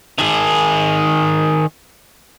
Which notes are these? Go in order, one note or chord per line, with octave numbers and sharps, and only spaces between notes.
D#3 G#4